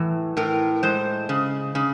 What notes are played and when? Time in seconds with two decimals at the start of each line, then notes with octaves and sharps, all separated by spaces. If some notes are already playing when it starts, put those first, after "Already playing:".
Already playing: A2 E3
0.37 A2 A#4
0.83 G#3 C5
1.29 C#3
1.75 C#3